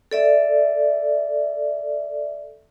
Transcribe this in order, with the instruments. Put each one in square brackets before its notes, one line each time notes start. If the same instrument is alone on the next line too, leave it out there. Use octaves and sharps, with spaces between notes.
[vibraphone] A4 D5 E5